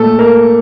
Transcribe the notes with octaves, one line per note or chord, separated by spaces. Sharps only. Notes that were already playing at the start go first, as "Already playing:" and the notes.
Already playing: A#2 A3 A4
A#4